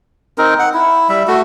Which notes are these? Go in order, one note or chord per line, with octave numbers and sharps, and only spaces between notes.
C4 D#4 A#4
F#5
E4
G3 E5
A3 F#4